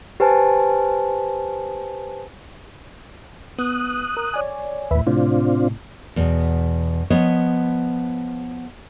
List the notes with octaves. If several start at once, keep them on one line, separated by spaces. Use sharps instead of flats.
G4 B4 C5 G#5 A5
B3 D#6 F#6
A#4
C#5 D5 G#5
D#2 A2 B4 E5
A2 C3 C4 D4 F4
E2 B2
F3 B3 C#5 D#5